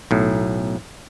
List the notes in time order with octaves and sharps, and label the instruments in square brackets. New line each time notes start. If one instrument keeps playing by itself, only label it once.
[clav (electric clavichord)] B1 A2